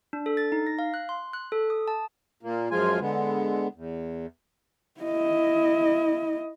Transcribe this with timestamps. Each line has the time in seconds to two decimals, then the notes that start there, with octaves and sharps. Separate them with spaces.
0.13 D4
0.26 A4
0.37 A6
0.52 D#4
0.67 A#6
0.79 F5
0.94 F#6
1.09 C6
1.33 F#6
1.52 A4
1.70 D#6
1.88 A5
2.43 A#2 A#3
2.71 F#2 F3 G#3 F4 G#5
3.00 D3 G#3 B3
3.75 E2
5.01 E4 D#5